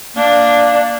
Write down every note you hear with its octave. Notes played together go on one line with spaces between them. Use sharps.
A#3 D4